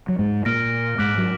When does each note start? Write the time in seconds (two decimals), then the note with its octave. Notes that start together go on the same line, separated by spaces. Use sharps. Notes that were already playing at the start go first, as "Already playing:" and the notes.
0.08 F#3
0.19 G#2 G#3
0.45 A#2 A#3 F6 A#6 D7
0.98 G#2 G#3 D6 F#6 B6 D7 F#7
1.18 F#3